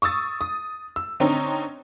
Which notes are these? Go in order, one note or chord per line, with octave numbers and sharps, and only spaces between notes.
C#6 D#6 E6 A6
D#6
E6
D3 C4 C#4 D#4